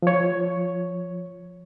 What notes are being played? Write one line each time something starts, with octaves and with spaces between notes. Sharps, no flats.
F3 C#5